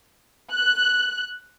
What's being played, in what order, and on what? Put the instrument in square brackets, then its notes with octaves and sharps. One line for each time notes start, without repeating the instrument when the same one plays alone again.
[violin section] F#6